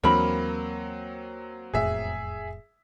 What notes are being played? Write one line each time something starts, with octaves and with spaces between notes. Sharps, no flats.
D#2 E3 F#3 A#3 C4 D4 A#4 B5
E1 F2 A2 G#4 E5